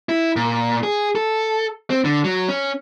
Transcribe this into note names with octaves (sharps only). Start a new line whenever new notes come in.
E4
A#2
G#4
A4
C4
D3
F#3
C#4